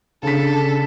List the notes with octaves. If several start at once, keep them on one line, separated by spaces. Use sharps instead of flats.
C#3 D4 A4 B6